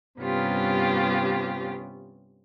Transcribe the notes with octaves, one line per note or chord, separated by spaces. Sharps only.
G2 C3 B3 C#4 F4 G4